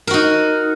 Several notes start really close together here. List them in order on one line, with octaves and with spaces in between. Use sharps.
A#4 F#4 D#4